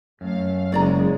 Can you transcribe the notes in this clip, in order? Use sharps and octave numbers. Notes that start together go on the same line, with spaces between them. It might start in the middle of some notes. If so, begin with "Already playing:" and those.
F#2 A3 F5
F#1 C#3 G#3 C#5 D5 A#5